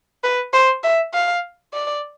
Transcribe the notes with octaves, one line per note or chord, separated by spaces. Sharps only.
B4
C5
E5
F5
D5